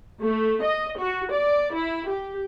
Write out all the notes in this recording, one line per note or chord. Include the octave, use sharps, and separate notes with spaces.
A3
D#5
F#4
D5
E4
G4